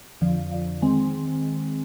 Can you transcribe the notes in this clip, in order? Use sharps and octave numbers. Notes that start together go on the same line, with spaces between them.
F2 D3 F3
F2 D3 F3
D#3 G#3 C4